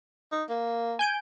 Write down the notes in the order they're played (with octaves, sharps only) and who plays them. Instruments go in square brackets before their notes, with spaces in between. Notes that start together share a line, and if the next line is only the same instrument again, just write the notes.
[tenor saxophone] D#4
A#3
[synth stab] G#5 G6 D7